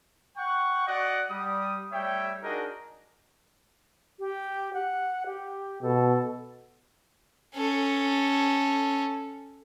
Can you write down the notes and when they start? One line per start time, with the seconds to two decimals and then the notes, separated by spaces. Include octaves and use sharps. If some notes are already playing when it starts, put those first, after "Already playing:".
0.37 F#5 G5 C#6
0.87 F#4 D5 D#5 F#5
1.30 G3 D#6
1.93 G3 A3 C#5 E5 G5
2.43 D4 D#4 F#4 G#4 A#4 D#5
4.20 G4
4.74 F#5
5.26 G4
5.83 B2 A4
7.55 C#4 A4